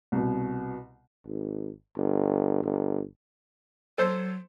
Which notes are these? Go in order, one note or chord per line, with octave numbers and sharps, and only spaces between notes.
C2 B2
G#1
G1
G1
F#3 A4 C5